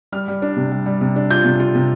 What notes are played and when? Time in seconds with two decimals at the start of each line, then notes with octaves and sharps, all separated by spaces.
0.12 G3 F6
0.28 G3
0.42 D4
0.56 C3
0.72 G3
0.86 G3
1.01 C3
1.16 D4
1.31 F4 G6
1.45 C3
1.60 F4
1.75 C3